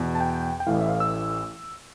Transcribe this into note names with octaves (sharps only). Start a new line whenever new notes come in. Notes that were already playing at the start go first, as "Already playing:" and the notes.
Already playing: E2 B2
A5
G5
G5
A1 A2 E3 F5
E5
F5
E6